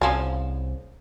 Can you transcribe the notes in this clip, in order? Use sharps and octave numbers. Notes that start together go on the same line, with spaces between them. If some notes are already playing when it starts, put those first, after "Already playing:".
C2 C#3 F3 G#4